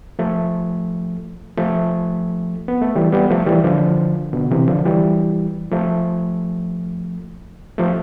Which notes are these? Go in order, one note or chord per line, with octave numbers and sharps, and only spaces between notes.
F3 A3
F3 A3
B3
A3
E3 G3
G3 B3
F3 A3
E3 G3
D3 F3
B2 D3
C3 E3
D3 F3
E3 G3
F3 A3
F3 A3